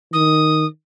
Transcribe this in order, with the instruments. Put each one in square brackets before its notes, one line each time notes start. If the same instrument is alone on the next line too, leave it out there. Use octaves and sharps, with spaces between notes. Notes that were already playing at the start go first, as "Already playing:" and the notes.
[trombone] D#3 [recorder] D#6